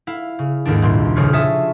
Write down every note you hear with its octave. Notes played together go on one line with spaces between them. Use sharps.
E4 F5
C#3
D#2 G#2 D#3 D4
C2 A#2 C6
D#1 F2 C#3 C#5 F6 C7
F4 C#5 E5 A5 D#6